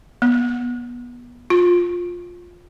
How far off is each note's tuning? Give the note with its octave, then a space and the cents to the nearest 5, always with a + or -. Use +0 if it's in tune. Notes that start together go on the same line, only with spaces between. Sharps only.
B3 -25
F4 +10